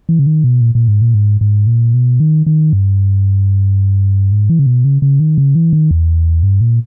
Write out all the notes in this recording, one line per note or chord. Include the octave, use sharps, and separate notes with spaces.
E3
C#3
D#3
B2
A#2
A#2
G#2
A#2
G#2
G#2
A#2
B2
D#3
D#3
G2
G#2
E3
C#3
B2
C#3
C#3
D#3
C#3
E3
D#3
E2
G2
A#2